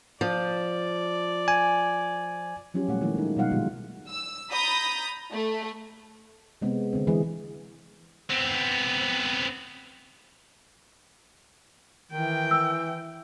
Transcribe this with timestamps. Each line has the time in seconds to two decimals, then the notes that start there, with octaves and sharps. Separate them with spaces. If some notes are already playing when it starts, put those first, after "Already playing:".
0.21 F3 D5
1.48 G#5
2.74 F3 F#3 C#4 F4 G4
2.88 A#2 G3 A3 F#5
3.01 D#3 F3 A3 A#3 E4
3.15 G#3 A#3 D#4
3.37 B2 F#3 G3 D#4 F5 F#5
3.51 A#2 D3 F3 G#3 F4 F#4
4.09 E6
4.50 A#5 B5 D#6 G6 A6
5.32 A3
6.62 C3 G#3 B3 C4
6.93 D3 C4
7.07 E3 G#3 G#4
8.30 B3 C4
12.12 D#3 E3 G5
12.51 E6